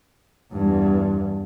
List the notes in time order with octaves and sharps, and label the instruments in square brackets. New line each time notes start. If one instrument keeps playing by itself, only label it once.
[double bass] E2 G2